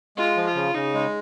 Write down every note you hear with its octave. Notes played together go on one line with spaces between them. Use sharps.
G#3 F4
F3
F4
C#3
C#3 D#4
G#3